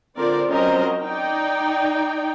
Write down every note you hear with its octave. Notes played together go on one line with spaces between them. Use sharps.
D3 C4 F4 A#4 C5 D5
F#3 C4 C#4 A#4 C5 D#5
D#4 D5 G5